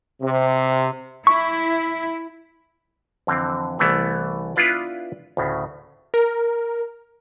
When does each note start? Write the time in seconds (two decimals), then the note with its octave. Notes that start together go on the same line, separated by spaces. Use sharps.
0.22 C3
1.27 E4 C#6
3.27 F2 D3 E3 C4
3.79 C2 E3 A3 B3
4.56 B3 D4 E4 F4 B4 D5
5.37 D2 A2 C#3
6.14 A#4